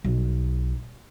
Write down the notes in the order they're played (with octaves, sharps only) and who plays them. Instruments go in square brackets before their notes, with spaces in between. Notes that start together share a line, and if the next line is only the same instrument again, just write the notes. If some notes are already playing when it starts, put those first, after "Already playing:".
[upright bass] B1